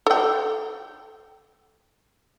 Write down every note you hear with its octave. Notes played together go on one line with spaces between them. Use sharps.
A4 G5